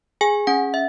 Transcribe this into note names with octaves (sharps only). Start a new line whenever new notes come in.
G#4 G#5
C#4 F#5
E5